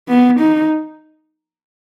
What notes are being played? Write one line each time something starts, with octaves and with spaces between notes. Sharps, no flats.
B3
D#4